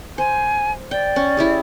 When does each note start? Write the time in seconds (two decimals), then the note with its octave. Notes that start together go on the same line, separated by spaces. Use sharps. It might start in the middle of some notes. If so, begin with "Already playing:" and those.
0.18 C5 G#5
0.91 D5 G5
1.16 C#4
1.37 E4 G4 G#4